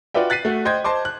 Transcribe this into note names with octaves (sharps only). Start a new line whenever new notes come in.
F4 F#4 B4 D5 E5 G5
F#6 A6 B6 C7 D#7
A3 F#4
C5 D#5 G5 C6 G6 G#6
C5 D#5 A5 C6 D6
F#6